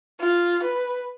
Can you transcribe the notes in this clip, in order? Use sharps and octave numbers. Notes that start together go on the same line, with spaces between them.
F4
B4